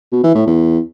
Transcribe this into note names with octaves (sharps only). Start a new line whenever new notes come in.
B2
E3
A2
E2